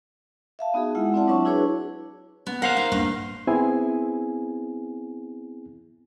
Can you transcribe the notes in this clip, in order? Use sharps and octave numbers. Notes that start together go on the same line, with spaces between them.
E5 F5 A5
B3 D#4 F#4 G#4
G#3 E4 F4 E5 F#5
C4 E4 D5 F#5 A5
F#3 D4 C#5 E5 A5 C#6
D4 E4 F#4 G#4 B4 C#5
B3
A#4 C5 F5 F#5
D#4
E1 A1 G2 A#3
B3 C4 E4 G#4 G#5